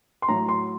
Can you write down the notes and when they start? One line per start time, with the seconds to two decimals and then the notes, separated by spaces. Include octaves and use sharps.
0.22 C6
0.28 A2 F#3 A#5
0.49 C6